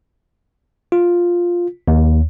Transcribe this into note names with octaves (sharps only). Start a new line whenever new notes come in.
F4
D#2